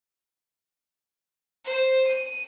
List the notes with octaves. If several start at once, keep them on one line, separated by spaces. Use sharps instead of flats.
C5
D#7